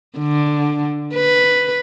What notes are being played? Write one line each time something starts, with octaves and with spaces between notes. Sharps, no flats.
D3
B4